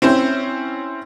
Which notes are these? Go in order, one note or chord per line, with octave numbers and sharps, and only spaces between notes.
C4 C#4 E4 C5